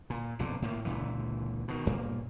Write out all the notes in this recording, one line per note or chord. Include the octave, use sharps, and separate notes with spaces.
A#2
B1 F2 A#2 D3
A2 A#3
C#2 A#2 D3 E3
B2 D#3
B1 G2 A#2 A#3